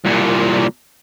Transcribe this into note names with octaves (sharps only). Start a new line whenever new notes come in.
C2 A#2